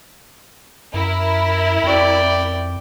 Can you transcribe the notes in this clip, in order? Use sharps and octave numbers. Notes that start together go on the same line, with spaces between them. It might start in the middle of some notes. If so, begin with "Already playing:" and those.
F#2 E4 A#4
F2 D5 G5